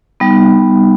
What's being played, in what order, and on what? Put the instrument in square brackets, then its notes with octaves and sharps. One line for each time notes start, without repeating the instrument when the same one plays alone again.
[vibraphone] G3 B3 D#4